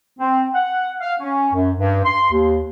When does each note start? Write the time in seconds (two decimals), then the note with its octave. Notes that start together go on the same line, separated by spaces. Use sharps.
0.19 C4
0.54 F#5
1.01 F5
1.20 C#4
1.53 F#2
1.77 G2
2.04 C6
2.31 D#2